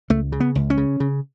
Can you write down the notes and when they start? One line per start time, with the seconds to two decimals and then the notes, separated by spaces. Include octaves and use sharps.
0.10 C#2 A3
0.32 C#3
0.40 B3
0.55 C#2
0.70 C#4
0.77 C#3
1.00 C#3